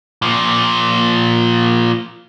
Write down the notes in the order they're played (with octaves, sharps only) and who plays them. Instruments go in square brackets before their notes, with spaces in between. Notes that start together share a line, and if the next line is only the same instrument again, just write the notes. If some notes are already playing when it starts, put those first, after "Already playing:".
[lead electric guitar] A#2 F3